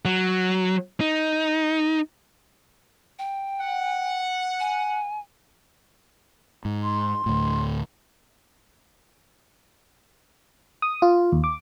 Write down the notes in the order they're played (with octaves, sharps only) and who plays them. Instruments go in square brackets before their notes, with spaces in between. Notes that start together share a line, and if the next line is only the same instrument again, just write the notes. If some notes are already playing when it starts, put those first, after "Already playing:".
[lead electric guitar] F#3
D#4
[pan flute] G5
[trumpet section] F#5
[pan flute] G#5
[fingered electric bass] G#2
[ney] C6
[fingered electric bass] D2 A2
[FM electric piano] D#6
F4
D#2
D6